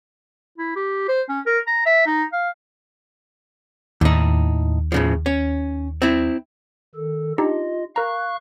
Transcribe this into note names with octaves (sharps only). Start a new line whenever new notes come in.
E4
G4
C5
C#4
A#4
A#5
E5
D#4
F5
D#2 A2 D#4
A2 C#3 F3
C#4
C4 E4
D#3 A4
D4 D#4 F4 G4 D#5
A#4 F5 A#5 C#6 F#6